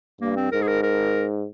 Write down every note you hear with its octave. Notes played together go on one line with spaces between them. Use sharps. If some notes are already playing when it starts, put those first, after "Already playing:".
G2 A#3
C4
G#2 A#4
G#4
A#4
A#4